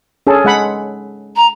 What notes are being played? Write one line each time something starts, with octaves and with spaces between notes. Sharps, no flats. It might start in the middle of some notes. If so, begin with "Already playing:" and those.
C#4 G#4 A4
G#3 F#5 B5
A#5